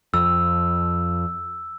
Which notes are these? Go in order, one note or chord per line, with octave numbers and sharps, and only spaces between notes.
F2 E6